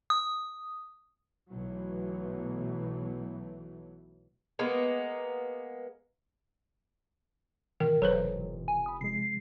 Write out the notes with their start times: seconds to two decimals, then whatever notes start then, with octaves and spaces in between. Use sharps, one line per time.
0.10 D#6
1.52 B1 B2 E3 F#3 A3
4.59 G#3 A#3 B3
7.80 G#2 B2 D#3 E3 A#4
8.02 F1 F#3 A4 B4 C5
8.68 G#5
8.86 B5 D#6
9.01 C3 F3 G#3 C7